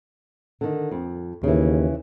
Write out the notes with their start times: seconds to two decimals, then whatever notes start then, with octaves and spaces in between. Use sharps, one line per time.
0.61 D3 D#3
0.91 F2
1.43 D#2 C#3 E3